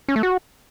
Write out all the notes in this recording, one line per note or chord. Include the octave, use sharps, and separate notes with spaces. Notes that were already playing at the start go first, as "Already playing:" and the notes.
C#4
A3
F#4